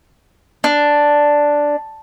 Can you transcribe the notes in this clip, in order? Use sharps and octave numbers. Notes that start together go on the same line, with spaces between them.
D4